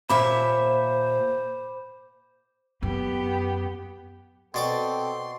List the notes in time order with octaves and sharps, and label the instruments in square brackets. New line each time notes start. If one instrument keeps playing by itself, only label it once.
[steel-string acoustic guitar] D#2 A#2 E5 [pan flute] C5 [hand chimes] B5 D6
[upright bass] F#2 [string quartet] B3 G4
[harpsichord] B2 D5 D6 [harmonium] C4 A4 G5 [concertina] C6